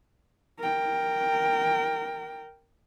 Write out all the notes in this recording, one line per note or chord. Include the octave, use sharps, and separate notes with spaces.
A#4 G5